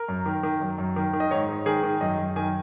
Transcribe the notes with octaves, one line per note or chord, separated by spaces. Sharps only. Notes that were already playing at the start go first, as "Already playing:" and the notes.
Already playing: A#4
F#2
D#3
D#3
F#2
F#2
D#3
D#3
D#5
G#2 C#5
G#2
D#3 G#4
D#3
F#2 D#5
F#2
D#3 G#5